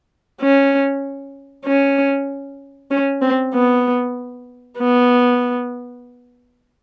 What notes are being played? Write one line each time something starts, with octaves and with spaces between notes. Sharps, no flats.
C#4
C#4
C#4
C4
B3
B3